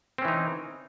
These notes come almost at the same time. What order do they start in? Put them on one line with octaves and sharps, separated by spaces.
C4 C#4 E3 D#4